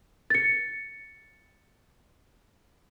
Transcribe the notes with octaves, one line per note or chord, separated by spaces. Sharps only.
A6 C#7